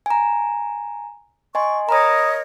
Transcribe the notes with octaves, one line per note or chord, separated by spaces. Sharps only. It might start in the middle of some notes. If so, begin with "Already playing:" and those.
G#5 A#5
D#5 G#5 C6 C#6
A#4 C#5 D#5 A#5 B5 D#6